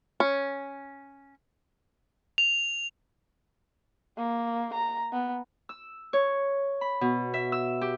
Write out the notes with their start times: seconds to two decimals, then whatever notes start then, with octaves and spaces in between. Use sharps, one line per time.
0.20 C#4
2.38 F7
4.17 A#3
4.74 A#5
5.13 B3
5.69 E6
6.13 C#5
6.81 B5
7.01 B2
7.34 E5
7.52 E6
7.81 G4